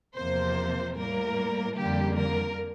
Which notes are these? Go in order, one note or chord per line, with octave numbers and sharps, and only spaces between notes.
E2 C3 F3 A#3 C5
A2 G3 A#3 A#4
F2 D3 G3 A#3 G4
A#4